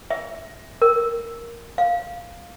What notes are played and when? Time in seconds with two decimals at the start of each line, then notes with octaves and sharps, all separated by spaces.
0.11 E5
0.82 A#4
1.78 F5